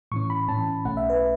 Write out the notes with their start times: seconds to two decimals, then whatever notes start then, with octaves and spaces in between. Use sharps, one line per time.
0.12 A2 E3 C#4 C#6
0.30 B5
0.48 A2 E3 C#4 A5
0.85 B1 B2 A3 C#4 F#5
0.97 E5
1.10 B4
1.17 E5